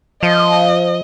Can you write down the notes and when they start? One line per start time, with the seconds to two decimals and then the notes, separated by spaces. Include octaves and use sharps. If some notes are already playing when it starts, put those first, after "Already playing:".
0.23 F3 D#5